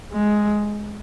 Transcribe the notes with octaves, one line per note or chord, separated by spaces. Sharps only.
G#3